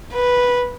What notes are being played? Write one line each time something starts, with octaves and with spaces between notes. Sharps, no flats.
B4